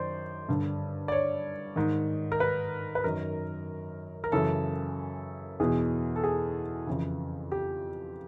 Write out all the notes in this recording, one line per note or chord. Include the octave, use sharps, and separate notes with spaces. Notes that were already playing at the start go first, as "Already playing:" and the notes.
Already playing: F#2 D#3 C5 D5
G2 D3
D5
C#5
G#2 D#3
A#4
B4
B4
F#2 D#3 A#4
A#4
F#2 C#3 E3 A4
E2 B2 G#4
A4
G#4
F2 C#3 E3
G4